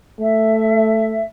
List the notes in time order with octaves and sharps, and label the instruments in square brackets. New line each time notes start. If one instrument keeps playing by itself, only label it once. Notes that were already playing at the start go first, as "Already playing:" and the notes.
[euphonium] A3 [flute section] E5